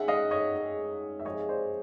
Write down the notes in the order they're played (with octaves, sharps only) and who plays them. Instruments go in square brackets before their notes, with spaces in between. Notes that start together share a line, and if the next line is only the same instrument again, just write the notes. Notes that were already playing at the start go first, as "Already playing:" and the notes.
Already playing: [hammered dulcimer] D#3 G#3 C#4 [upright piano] E5 F#5
[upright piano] D#5 F5
C#5 D#5
[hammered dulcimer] D#3 G#3 C#4
[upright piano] E5
[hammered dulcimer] C3 F3 G#3 [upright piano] C#5 D#5
[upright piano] C5 D5